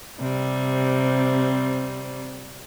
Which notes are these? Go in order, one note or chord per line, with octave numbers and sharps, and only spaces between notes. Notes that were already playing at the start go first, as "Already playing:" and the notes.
C3 G3 C4